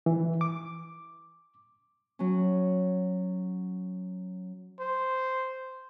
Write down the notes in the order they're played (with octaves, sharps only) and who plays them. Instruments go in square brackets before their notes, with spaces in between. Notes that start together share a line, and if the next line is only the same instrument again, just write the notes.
[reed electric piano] E3
D6
[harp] F#3 C#4
[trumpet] C5